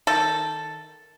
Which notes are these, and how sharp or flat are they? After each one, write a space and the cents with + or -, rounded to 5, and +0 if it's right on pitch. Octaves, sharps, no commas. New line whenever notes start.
D#3 +0 A4 +0